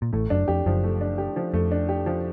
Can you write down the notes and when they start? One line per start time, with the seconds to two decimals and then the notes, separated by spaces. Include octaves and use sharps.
0.02 A#2
0.13 A1 A2 A3
0.30 F#1 F#2 D4
0.48 F2 G4
0.66 F#1 F#2 F3
0.84 A3
1.01 D4
1.18 G4
1.36 F3
1.53 F2 A3
1.71 D4
1.89 G4
2.06 F3